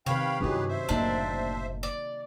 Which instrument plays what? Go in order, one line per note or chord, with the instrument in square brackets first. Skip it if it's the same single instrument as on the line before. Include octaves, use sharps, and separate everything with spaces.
[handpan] C3 D#3 B4 [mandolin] C#5 [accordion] F5 G5 B5
[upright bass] G2 E4 [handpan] F#3 C#4 D#4 [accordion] G4 G#4 B4
[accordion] C5 E5
[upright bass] F#1 A2 [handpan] A#3 D#4 [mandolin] D4
[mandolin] D5